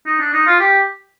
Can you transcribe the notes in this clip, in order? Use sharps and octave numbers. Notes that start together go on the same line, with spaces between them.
D#4
D4
D#4
F4
G4